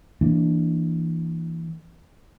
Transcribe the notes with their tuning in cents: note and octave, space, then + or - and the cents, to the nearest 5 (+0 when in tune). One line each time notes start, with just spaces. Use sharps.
E3 +0 A#3 +0 D4 +0